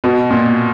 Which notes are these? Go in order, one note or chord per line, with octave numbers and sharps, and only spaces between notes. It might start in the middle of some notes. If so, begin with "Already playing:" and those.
B2
A#2